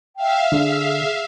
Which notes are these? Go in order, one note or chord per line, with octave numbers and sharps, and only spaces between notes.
E5 F5 G5
D3 G#4